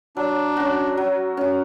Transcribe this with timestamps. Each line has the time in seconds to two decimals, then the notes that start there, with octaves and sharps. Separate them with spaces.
0.16 F#3 D4
0.57 C#4 F#4
0.97 F#3
1.37 C#4 F#4